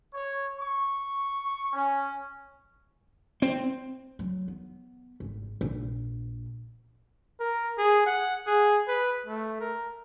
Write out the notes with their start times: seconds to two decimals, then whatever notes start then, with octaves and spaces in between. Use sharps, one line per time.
0.14 C#5
0.60 C#6
1.73 C#4
3.42 C4
4.19 F#3
4.48 B3
5.20 G#1
5.61 A#1
7.40 A#4
7.78 G#4
8.06 F#5
8.47 G#4
8.88 B4
9.26 A3
9.60 A#4